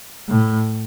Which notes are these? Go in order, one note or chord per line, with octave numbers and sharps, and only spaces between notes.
A2